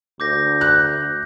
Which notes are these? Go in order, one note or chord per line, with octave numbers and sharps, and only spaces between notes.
D2 D6 G6 A#6
F#6